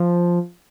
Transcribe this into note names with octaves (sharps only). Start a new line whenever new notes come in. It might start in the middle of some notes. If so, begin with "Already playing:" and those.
Already playing: F3